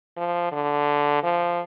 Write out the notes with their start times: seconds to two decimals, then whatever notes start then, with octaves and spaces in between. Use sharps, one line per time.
0.17 F3
0.52 D3
1.24 F3